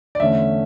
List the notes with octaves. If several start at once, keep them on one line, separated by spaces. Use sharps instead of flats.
D5
E2 D3 A3 C#4 E5